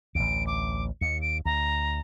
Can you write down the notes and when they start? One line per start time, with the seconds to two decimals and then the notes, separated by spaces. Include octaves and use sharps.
0.15 A1 D2 D7
0.47 D6
1.01 D#2 C#7
1.22 D7
1.45 D2 A#5